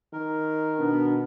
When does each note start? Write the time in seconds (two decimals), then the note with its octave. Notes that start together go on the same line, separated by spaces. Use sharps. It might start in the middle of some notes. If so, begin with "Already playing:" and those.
0.13 D#3 A#4
0.79 B2 B3 D4